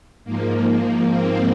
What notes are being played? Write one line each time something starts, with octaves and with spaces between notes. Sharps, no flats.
G#2 F3 A#3
C4